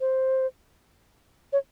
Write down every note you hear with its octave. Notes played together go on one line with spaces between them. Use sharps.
C5
C#5